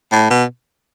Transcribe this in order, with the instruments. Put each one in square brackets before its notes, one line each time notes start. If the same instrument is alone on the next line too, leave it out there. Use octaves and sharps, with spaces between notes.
[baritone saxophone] A2
B2